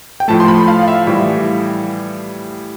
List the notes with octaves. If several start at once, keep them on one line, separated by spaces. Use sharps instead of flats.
G5
A2 F3 A3 A5
C6
B5
F5
F5
E5
A2 E3 G3